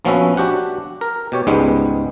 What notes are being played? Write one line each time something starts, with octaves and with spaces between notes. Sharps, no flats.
A#1 F3 B3 C#4 F#4 E5
D4 F#4 G4 F#5
A#4
B2 G4 C#5
C#2 G#2 G3 G#3 B3